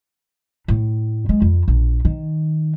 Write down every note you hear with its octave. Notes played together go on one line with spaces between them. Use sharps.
A2
G#3
F2
A#1
D#3